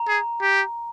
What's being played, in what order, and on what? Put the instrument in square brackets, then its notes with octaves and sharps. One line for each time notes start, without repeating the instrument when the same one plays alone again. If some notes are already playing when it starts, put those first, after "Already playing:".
Already playing: [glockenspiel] A#5
[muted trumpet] G#4
G4